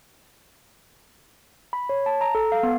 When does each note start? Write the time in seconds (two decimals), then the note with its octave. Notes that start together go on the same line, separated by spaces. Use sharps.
1.73 B5
1.89 C#5
2.06 A5
2.21 A#5
2.35 A4
2.52 F5
2.63 B3